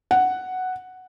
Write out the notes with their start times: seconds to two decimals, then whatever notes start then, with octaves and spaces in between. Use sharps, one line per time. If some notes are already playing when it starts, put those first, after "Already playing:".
0.11 F#5